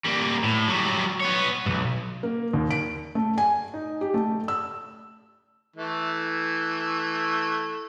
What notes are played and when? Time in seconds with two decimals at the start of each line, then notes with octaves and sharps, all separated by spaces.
0.05 G3 A#3
0.44 A2
0.68 F#3 G3
1.21 B3 C#5
1.66 B1 G2
2.23 A#3
2.53 D#2
2.71 D7
3.15 A3
3.38 G#5
3.74 D#4
4.01 G4
4.14 A3
4.48 E6
5.76 E3 A3